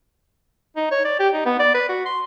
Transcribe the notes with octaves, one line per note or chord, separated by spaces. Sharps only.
D#4
C#5
D5
G4
D#4
B3
D5
B4
F#4
C6